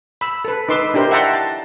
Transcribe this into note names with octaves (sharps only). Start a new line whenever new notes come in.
B5 E6
A4 B4
D#4 B4 C6 D6 E6
D4 E4 G4 A#4 C5
E5 F#5 G5 A5 A#5 C6
A5